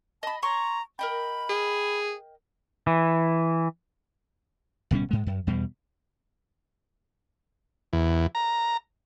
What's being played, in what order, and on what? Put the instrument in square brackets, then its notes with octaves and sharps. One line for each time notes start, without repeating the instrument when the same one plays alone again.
[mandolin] D#5 B5 [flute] A5
[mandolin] C#5 C6 C#6 [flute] A#5
[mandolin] A#4 D#5 G5 [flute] B5
[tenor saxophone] G#4
[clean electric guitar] E3
[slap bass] D1 B2 G3 C#4
G#2 G#3
F#2
E2 B2 G3
[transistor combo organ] E2
A#5